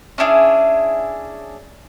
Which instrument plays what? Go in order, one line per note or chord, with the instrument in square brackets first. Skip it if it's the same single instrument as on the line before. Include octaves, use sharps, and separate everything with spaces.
[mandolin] C#4 D4 E4 G#4